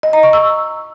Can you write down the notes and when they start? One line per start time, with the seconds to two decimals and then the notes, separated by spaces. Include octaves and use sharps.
0.03 D#5
0.13 A#5
0.23 C#6
0.33 E6